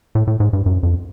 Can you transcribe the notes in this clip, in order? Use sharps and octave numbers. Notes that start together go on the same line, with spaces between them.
A2
A2
G#2
G2
F#2
F2